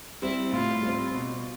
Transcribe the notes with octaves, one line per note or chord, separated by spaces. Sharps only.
G3 C4 E4
A2 F4
G3 C4
B2